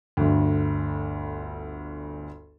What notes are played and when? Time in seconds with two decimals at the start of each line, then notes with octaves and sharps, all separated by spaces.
0.17 G1 D2